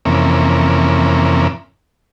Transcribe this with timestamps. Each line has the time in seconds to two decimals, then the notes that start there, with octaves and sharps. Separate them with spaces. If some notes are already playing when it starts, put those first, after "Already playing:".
0.05 F2 C3 E3 A#3 C#4